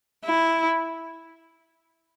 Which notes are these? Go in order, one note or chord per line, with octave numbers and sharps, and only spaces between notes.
E4